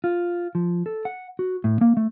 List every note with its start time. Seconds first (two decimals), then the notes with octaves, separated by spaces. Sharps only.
0.04 F4
0.55 F3
0.86 A4
1.05 F#5
1.39 F#4
1.64 A2
1.81 A#3
1.97 A3